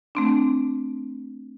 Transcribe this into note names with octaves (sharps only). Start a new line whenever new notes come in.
A3 C4 D4